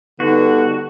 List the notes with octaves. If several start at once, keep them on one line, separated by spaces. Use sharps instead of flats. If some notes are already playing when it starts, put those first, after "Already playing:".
D3 G3 B3 D#4 F#4